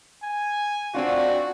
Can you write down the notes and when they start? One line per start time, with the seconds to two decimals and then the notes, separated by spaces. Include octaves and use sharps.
0.23 G#5
0.94 C4 D4 F4 F#4